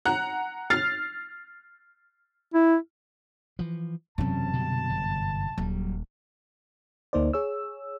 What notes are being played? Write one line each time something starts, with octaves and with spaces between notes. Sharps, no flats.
F#5 A#5 F#6
F6 A6 C7
E4
E3 F3
E1 F#2 C3 C4 C#4 A5
B2 D3 G3
G1
D#1 F#3 G3
D2 A#3 D#4 C5 D5
G#4 C#5 E6